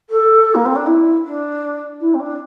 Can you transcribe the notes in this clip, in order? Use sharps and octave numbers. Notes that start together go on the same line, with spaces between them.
A4
A#3
C4
D4
E4
D4
E4
C4
D4